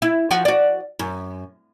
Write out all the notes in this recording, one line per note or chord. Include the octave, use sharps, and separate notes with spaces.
E4
F3 F4 F#4
F#4 D5
F#2